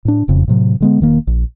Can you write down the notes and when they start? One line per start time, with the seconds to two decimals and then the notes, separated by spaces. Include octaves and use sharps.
0.05 A2 D4
0.28 E1 F2 C#3
0.48 A2 C3 F#3
0.80 D3 G#3 B3
1.00 E1 D#3 A#3
1.27 A#1